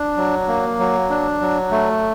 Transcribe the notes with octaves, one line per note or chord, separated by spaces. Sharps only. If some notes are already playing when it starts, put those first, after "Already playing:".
Already playing: D4
F#3
A#3
F#3
D4
F#3
A3